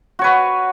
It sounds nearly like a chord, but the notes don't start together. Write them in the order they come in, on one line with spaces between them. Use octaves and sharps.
F#4 C#5 B4